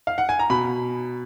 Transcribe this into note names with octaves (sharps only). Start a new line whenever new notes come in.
F5
F#5
G#5
A#5
B2 B5